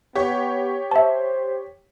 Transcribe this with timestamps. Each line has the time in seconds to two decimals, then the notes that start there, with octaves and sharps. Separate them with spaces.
0.15 B3 G4 C#5
0.91 C5 E5 A5